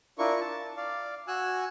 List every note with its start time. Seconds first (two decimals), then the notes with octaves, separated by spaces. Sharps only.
0.19 D4 E4 F4 A#4 C#6
0.41 A5
0.77 D5 F5
1.28 F#4 G#5 E6 F#6